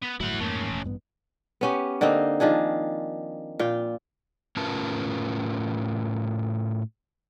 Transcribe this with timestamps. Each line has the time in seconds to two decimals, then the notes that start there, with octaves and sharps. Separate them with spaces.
0.02 B3
0.20 G1 A2 F#3 E4 F#5
0.40 F2 G#2 A3 A#3 C#4
0.70 E1
0.84 A1 G2 B3
1.61 B3 C#4 G4
2.01 D3 A#3 C4 D#4
2.40 D#3 F3 D4 G#4
3.59 A#2 F4 G5
4.57 A2 C#4 F4 A#4 B4 A5